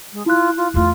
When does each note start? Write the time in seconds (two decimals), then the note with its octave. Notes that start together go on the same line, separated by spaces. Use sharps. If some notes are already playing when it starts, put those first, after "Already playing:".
0.13 G#3
0.26 E4 F4 F#6
0.57 F4
0.74 E2 A3 F4